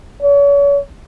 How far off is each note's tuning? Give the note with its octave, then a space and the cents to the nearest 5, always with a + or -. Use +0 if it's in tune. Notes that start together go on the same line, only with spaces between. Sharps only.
C#5 +40